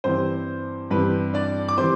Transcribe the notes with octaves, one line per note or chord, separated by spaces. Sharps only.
G2 E3 G3 C4 C5
G2 E3 G3 C4 B4
D4 D5
D6
E3 G3 C4 C5 C6